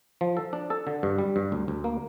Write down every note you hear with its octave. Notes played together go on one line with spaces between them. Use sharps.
F3
A4
D4
A4
D3
G2
G3
G2
D2
D2
A#3